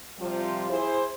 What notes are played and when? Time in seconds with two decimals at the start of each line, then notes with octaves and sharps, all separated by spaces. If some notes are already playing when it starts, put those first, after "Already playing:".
0.20 C3 F3 G3 C4 F4
0.69 E4 G#4 C5